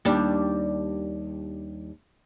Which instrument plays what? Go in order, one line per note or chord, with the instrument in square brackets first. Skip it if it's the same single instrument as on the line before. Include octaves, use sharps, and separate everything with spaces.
[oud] D#2 G3 D4